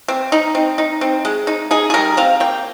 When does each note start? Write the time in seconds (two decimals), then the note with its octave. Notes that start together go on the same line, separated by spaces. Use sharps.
0.08 C4
0.32 D#4
0.55 C4
0.78 D#4
1.01 C4
1.25 G#3
1.47 D#4
1.71 D#4 G#4
1.90 G#4
1.94 G3 A#4
2.17 C4 F5
2.40 A#3 G5